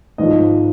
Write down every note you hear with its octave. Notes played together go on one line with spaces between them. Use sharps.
G#1 G#2 F3 D#5